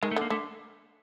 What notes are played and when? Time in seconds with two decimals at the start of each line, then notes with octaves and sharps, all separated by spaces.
0.03 D#3 G#3
0.11 A3
0.16 D3
0.21 A#3
0.30 D3 A3